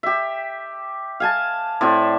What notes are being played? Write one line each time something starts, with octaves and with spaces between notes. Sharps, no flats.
G4 E5
F5 G#5 A5
A2 C4 D5 E5